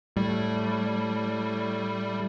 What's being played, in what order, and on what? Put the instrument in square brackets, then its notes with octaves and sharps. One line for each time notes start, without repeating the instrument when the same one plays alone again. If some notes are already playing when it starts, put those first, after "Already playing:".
[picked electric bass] A2 [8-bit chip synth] G3